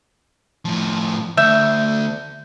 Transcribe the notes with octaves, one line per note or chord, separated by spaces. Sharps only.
A2 F3
D2 E5 G6